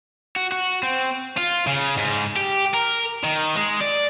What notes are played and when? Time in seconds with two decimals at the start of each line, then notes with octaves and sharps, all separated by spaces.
0.36 F#4
0.52 F#4
0.83 C4
1.37 F4
1.67 C#3
1.98 G#2
2.36 G4
2.74 A#4
3.23 D#3
3.55 G#3
3.81 D5